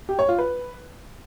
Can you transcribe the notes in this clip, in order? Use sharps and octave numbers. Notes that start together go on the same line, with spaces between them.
G4
C#5
F4
B4